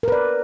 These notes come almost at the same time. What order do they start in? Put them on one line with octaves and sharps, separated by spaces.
A#4 B4 D5